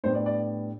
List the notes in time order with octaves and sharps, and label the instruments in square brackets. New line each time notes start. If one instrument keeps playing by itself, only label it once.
[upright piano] A2 G3 B3 D4 C5
D5
D5